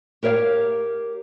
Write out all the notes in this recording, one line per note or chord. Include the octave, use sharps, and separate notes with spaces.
G4 A#4 C#5 E5 F5